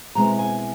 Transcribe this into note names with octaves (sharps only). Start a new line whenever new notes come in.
B2 G#3 C4 E4 A#5
G#5